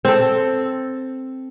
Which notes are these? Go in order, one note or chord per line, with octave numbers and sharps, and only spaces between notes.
C4 A4